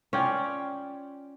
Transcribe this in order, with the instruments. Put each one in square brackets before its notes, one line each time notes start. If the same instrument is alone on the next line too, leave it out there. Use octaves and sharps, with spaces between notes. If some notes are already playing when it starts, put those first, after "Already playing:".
[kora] C#4 [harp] F4 D5 G5